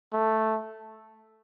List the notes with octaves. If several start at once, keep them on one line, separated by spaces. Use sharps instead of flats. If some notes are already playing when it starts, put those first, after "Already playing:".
A3